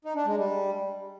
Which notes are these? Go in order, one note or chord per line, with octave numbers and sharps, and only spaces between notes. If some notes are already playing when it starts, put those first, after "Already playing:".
D#4
D4
G#3
G3